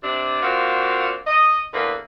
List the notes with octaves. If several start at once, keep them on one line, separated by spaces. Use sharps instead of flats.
C3 D4
A#3 C4 D4 F4 F#4
D#5
E2 D3 A#3 B4